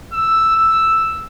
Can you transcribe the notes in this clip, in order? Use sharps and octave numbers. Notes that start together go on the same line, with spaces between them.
E6
E6